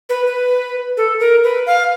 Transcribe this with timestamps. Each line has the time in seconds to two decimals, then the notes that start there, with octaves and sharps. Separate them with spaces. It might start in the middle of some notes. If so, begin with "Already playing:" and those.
0.09 B4
0.27 B4
0.97 A4
1.20 A#4
1.44 B4
1.67 F5